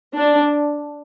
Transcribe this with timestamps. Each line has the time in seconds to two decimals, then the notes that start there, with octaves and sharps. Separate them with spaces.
0.15 D4